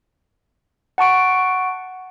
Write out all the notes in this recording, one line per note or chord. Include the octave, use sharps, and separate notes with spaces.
F#5 A5 C#6 D7